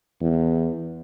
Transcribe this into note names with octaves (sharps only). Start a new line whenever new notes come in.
E2